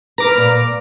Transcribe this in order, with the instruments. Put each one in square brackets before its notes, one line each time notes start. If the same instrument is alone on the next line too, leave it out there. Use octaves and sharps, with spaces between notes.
[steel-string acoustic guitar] B4 [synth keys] A#5 D6 F6
[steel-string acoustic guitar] A#2